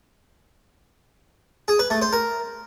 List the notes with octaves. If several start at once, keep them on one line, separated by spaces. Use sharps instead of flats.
G#4
B4
A3
C5
A#4